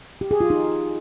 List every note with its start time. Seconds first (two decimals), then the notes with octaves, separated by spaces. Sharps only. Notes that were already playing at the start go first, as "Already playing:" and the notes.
0.21 G4
0.31 G#4
0.40 F4
0.50 D#4